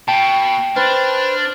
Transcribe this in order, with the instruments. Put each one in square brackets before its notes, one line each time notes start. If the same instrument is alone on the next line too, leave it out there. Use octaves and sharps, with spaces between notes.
[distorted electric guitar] B2 [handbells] G5 A5
[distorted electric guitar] D4 [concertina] B4 C5 F6